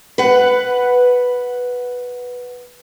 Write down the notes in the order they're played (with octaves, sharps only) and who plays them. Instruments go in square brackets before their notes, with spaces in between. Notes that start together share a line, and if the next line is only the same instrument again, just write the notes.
[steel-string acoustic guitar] B4 F#5